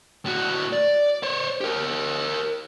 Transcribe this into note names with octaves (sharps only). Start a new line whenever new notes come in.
A2 F#4
D5
C5 C#5
G4 A#4